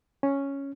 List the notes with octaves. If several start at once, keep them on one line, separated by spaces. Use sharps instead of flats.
C#4